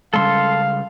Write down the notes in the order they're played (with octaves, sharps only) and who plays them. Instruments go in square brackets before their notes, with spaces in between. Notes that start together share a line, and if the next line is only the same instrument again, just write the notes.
[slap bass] C#3 G3 G#3 [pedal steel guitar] A4 C6 [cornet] F5